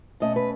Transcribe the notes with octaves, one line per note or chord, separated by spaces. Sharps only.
B2 A3 C#4 D#5
B4